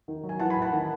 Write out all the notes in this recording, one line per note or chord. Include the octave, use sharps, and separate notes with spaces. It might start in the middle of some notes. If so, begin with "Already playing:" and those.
D#3
F#3
G#5
E3 F#5 A5
G#5 B5
A2
F#5 A5
D#3